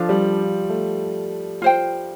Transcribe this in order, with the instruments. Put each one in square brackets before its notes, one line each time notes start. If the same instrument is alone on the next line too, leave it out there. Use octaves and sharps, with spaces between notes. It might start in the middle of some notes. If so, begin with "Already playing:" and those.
Already playing: [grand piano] F3 [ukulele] D4 F4 A4
[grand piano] G3
A3
[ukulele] F4 C5 G5